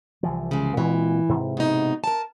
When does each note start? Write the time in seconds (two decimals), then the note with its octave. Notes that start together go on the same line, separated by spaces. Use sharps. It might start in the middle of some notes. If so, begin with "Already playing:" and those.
0.23 C2 E3 F3
0.51 C#3 G#3
0.77 A#2 E3 G#3 C4
1.29 G#2 C3
1.57 B2 D#4
2.04 A#4 A5